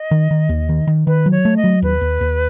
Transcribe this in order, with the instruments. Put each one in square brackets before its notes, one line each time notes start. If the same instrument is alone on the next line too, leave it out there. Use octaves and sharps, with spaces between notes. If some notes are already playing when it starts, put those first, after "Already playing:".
Already playing: [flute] D#5
[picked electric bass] D#3
D#3
D#2
D#3
D#3
[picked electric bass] D#3 [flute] B4
[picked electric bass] F#3
[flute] C#5
[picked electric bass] A3
[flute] D#5
[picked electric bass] F#3
[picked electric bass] D#2 [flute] B4
[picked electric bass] D#2
D#2